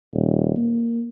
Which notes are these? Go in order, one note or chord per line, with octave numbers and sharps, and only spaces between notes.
D#1
A#3